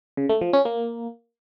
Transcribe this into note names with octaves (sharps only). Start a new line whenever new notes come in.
C#3
A3
F3
C#4
A#3